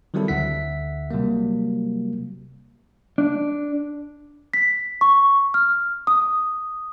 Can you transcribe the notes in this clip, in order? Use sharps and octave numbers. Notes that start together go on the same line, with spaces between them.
D#3 F#3 G3 C4 E4 A4
D2 D3 E5 F#5 B6
C3 F#3 G3 A#3
D4
B6
C#6
F6
D#6